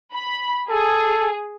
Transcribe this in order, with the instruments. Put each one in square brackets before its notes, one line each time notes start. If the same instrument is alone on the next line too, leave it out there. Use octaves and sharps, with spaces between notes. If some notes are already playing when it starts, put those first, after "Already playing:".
[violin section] B5
[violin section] G#4 [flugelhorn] A4